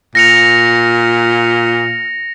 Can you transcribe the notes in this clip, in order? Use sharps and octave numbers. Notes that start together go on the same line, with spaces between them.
A#2 A#6 C#7 F7